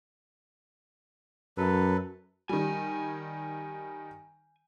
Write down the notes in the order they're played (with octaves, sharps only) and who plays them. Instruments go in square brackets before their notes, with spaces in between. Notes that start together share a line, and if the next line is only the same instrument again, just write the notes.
[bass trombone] F#2 [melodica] F#3 A4 B4
[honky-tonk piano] D#3 G3 [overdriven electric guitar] G#5